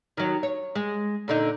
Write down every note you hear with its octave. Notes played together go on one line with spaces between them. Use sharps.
D#3 F#3
C#5
G#3
A#2 D3 D#4